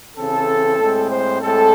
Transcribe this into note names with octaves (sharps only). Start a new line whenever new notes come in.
C#3 E3 C4 A4
A2 G#3 C4
C5
A2 G#3 C4 A4